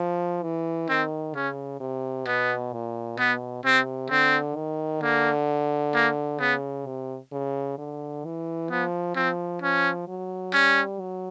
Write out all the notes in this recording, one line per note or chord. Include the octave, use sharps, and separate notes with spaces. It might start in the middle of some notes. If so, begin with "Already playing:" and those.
Already playing: F3
E3
D#3 C4
C#3 C#4
C3
B2 B3
A#2
B2 B3
C3 C4
D3 C4
D#3
D3 A#3
A#3
C#3 B3
C3
C#3
D3
E3
F3 B3
F3 C4
F3 C#4
F#3
G3 C#4
F#3